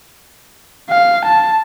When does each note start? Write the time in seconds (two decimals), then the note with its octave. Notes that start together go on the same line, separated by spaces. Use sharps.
0.90 F5
1.25 A5